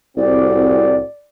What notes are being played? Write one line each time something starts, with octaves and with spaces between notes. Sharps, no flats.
C2 A2 C4 F#4 D5